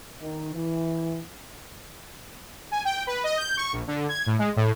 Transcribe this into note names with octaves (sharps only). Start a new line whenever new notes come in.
D#3
E3
G#5
G5
B4
D#5
G6
C#6
A#1
D3
G#6
A2
G#3
A2